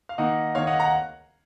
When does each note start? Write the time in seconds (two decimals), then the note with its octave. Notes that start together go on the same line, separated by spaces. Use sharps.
0.09 F5
0.18 D#3 A#3 D#4 D#5 F#5
0.55 D#3 A#3 D#4 C#5 F5
0.67 D#5 F#5
0.80 F#5 A#5